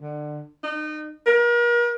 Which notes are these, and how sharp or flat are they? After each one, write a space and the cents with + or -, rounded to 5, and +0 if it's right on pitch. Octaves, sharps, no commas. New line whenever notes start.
D3 +25
D#4 -30
A#4 +40